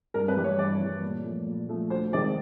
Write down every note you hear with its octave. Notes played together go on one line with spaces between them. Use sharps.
G2 A#4
B4
E3 G3
C#5
G2 D5
E3 G3
A#2
F3 A3
A#2
F3 A3
D2 C5
C3 D#3 G#3 D5